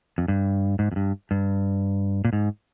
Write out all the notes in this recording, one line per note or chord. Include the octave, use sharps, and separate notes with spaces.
F2
G2
G#2
F2
G2
G2
A#2
G#2